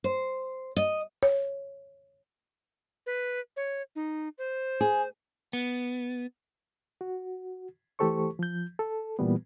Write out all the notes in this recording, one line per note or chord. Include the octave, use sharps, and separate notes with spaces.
C5
D#5
C#5
B4
C#5
D#4
C5
G#4
B3
F#4
E3 A3 G4 A4 C5 C#6
F3 G6
A4
A#2 E3 G3 B3